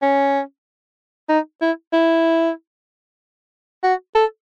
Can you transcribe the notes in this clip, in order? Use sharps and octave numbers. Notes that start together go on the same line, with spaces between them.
C#4
D#4
E4
E4
F#4
A4